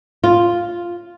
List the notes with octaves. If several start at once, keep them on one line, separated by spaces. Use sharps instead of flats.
F4